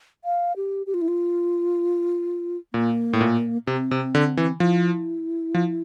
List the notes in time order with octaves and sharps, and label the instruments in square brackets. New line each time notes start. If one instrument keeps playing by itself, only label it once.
[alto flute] F5
G4
G4
F4
E4
F4
[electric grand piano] A#2 [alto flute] A#3
[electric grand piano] A2
A#2
[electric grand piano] C3 [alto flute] C4
[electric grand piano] C3
D3
E3
[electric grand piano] F3 [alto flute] E4
[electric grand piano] F3